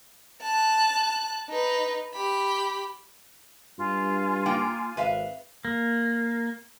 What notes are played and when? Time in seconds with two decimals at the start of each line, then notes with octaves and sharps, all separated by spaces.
0.41 A5 F#6
1.49 D#4 B4
2.14 G4 B5
3.79 G2 F4 G#5
4.46 A#3 D#4 G5
4.97 G#1 B4 E5 F5
5.65 A#3